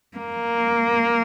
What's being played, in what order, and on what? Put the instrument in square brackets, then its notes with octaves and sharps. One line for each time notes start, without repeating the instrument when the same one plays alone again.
[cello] A#3